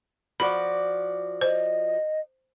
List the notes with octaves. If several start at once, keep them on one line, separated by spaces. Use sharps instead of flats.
F3 F#4 D5 B5
C5 D#5